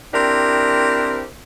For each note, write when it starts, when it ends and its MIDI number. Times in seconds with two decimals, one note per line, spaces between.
0.13 1.24 60
0.13 1.24 62
0.13 1.24 64
0.13 1.24 67
0.13 1.24 70